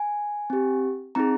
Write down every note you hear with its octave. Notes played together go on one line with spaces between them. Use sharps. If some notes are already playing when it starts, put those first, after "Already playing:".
Already playing: G#5
C4 G4
C4 D#4 G#4 A#5